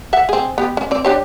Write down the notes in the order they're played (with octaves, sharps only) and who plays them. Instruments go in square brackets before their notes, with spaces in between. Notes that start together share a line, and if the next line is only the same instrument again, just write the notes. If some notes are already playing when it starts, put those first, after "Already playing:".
[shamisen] E5 F#5
C4 G#4
B3 G4
C#4
C4 D5
D4 G4 C#5